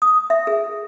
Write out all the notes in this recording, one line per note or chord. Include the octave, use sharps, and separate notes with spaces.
D#6
E5
G#4